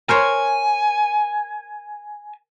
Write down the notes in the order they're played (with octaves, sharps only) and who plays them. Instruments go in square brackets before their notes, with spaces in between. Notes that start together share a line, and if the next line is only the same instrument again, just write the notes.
[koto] A#4 C5 C#5 [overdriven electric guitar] G#5